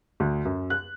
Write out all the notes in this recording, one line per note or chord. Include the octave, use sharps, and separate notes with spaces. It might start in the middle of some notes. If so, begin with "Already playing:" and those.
D2
F#2
F#6